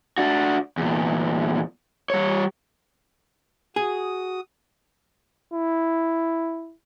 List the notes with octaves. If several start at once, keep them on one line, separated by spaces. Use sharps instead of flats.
D4 F#4
E2 A#2
G3 C#5
F#4 G#4 D#6
E4